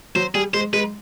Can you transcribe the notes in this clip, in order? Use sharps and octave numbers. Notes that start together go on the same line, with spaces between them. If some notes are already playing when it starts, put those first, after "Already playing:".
F#3 C5
G3 G#4
G#3 C5
G#3 B4